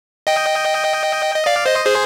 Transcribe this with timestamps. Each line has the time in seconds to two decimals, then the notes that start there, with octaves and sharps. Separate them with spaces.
0.27 D#5 G5
1.34 D#5
1.46 D5 F5
1.66 C5 D#5
1.85 G#4 C5